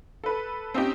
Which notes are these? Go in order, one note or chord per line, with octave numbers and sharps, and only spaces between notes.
A4 B4
C4 C#4 D#4 G4